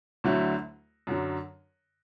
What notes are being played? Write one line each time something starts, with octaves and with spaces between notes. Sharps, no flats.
D2 D3 F#3 A3 E4
F#2 D3 F#3